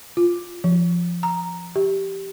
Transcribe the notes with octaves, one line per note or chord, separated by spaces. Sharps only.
F4
F3
A#5
G4